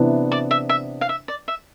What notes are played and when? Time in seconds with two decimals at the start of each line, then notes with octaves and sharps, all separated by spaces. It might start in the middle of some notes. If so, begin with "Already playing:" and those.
Already playing: C3 E3 B3 D4
0.32 D5
0.51 E5
0.69 E5
1.01 F5
1.09 E5
1.28 D5
1.48 E5